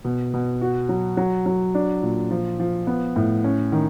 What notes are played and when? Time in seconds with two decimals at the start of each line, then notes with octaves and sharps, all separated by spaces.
0.05 B2
0.34 B2
0.62 F#4
0.89 F#3
1.17 F#3
1.46 F#3
1.75 D4
2.03 A#2
2.31 F3
2.60 F3
2.87 B3
3.16 A2
3.44 C#4
3.72 D#3